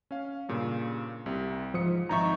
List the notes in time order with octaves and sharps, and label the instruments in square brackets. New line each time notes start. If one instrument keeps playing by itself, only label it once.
[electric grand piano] C#4 F5
G2 A#2 C#3
C2 C3
[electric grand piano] G#2 D#6 C#7 [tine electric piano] F3
[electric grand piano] G#1 D#4 E5 [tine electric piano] A#5 C#6